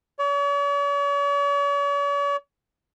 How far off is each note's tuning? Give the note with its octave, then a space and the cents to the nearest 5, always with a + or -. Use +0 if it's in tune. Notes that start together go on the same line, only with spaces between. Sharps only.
C#5 +45